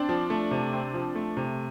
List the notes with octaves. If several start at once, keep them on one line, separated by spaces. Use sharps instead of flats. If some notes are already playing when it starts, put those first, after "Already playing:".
Already playing: C4 D4
F3
A3
C3
C4
F3
A3
C3